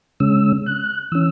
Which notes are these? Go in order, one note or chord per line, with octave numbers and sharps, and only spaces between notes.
C#3 G#3 C#4 E6
F#6
E3 C#4 E6